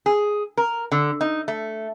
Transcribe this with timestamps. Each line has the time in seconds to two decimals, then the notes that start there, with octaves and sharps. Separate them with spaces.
0.06 G#4
0.57 A#4
0.92 D3
1.21 D#4
1.48 A3